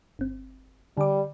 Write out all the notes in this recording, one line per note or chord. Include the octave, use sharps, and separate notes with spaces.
G1 C4
D3 G3 D6